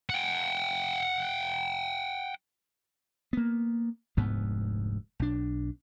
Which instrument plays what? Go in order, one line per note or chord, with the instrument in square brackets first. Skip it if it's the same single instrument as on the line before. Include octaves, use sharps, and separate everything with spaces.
[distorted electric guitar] F#5 G5
[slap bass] A#3 B3
F1 D2 G#2 B3
B1 D4